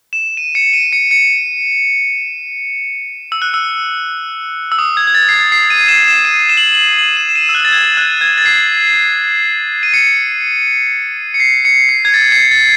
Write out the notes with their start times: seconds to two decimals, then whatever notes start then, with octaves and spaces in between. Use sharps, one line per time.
0.13 E7
0.37 D#7
0.55 C#7
0.73 D#7
0.92 C#7
1.11 C#7
3.32 E6
3.42 F#6
3.54 E6
4.72 E6
4.79 D#6
4.97 G#6
5.07 G#6
5.15 A6
5.29 C7
5.34 A6
5.52 C7
5.70 D#7
5.88 E7
6.08 E7
6.25 D#7
6.49 E7
6.57 F#7
6.64 E7
6.75 F#7
6.99 F#7
7.17 E7
7.29 E7
7.35 D#7
7.49 E6
7.55 F#6
7.65 A6
7.72 G#6
7.97 F#6
8.21 G#6
8.38 A6
8.46 C7
9.83 D#7
9.94 C#7
11.34 C#7
11.40 C7
11.65 C#7
11.89 C7
12.05 G#6
12.14 A6
12.32 C7
12.51 A6